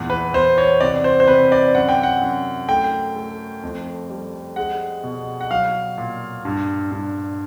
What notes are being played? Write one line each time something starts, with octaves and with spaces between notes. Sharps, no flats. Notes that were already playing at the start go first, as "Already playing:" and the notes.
Already playing: E2 A#2
B4
E2 C5
C#5
C3 D5
C5
C5
C3 B4
D5
F#2 F#5
G5
F#5
F#2
A3 G5
A3
F2
G3
G#3 F#5
B2
F#5
F#3 F5
A#2
G2
G2